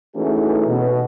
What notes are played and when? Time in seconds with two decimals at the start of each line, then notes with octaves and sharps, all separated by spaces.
0.15 E3 A3 C#4 D#4 F#4 G#4
0.68 B2